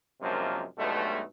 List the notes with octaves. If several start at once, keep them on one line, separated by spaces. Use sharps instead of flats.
F#2 C3 F3 G#3 A#3 D4
B1 G2 B2 G#3 A3